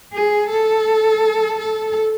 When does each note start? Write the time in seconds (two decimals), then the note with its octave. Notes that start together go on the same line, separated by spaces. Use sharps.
0.14 G#4
0.50 A4
1.59 A4